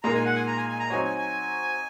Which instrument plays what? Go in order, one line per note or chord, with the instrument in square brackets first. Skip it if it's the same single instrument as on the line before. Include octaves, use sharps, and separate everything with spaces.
[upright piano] A#2 G#3 D#4 A#4 [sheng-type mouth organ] A#5
[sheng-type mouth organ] G#5
F#5
G#5
A#5
G#5
G#5
A#5
[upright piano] F#3 C4 D#4 F#4 C#5 [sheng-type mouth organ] G#5
[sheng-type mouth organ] G#5
G#5